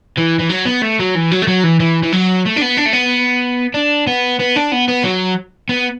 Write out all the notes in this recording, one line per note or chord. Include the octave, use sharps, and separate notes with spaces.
E3
E3
F#3
B3
A3
F#3
E3
F#3
A3
F#3
E3
E3
E3
F#3
A3
D4
B3
D4
A3
B3
D4
B3
B3
D4
B3
B3
F#3
B3